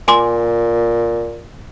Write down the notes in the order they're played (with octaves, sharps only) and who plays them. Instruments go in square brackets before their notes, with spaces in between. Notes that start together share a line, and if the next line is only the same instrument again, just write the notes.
[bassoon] A#2 [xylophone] G#5 C6 D6